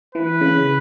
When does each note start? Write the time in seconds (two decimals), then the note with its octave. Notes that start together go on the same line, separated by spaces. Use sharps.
0.15 E3 B4
0.41 C#3